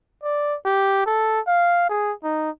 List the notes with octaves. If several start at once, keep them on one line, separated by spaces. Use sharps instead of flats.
D5
G4
A4
F5
G#4
D#4